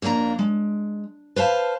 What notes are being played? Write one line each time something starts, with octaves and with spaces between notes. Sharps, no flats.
F2 A#3 D4 G#4 A#5
G#3
B4 C5 F5 A5